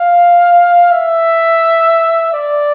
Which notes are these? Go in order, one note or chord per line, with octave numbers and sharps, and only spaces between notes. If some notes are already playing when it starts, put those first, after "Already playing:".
Already playing: F5
E5
D5